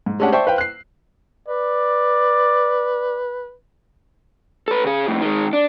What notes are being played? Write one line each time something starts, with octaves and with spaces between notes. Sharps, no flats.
G#2
G#3 A3 C#4 D4 G4 F#5
C5 D5 E5 G5 A5 C#6
B4 C5 F5 G5
F#6 C7
B4 D5
A4 B4
C#3 G#4
F2 A2
D#3 G#3
D4